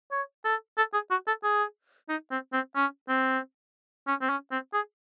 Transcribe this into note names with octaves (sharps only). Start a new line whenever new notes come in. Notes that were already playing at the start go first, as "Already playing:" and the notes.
C#5
A4
A4
G#4
F#4
A4
G#4
D#4
C4
C4
C#4
C4
C#4
C4
C#4
C4
G#4